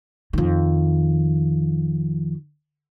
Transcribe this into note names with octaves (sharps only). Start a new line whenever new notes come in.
F2 D#3